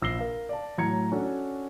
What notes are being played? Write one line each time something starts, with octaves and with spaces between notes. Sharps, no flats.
A#1 E6 A#6 C7 G7
A#4 F5
D5 A5
A2 F#3 A#5 G#6 C#7
C#4 D4 F#4 A4